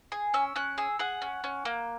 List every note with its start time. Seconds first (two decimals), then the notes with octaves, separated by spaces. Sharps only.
0.12 G#4
0.34 C#4 E6
0.56 C#4 F#6
0.78 G#4 E6
0.99 G#4 F#5
1.22 C#4
1.44 C#4
1.65 A#3